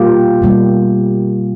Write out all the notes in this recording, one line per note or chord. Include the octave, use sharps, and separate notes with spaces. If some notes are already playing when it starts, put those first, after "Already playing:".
Already playing: B2 G3 A#3 F4 G4
B2 G3 A#3